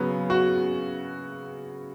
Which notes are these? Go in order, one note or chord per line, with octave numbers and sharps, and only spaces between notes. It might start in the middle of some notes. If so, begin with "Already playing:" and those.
Already playing: C#3 F#3 B3
F#4